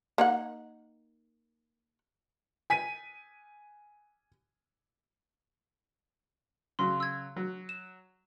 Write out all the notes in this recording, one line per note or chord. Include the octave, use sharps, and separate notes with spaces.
A#3 D#4 F#5
G#5 B6 D#7
C#3 F#3 C6
E6 G#6
F#3
E7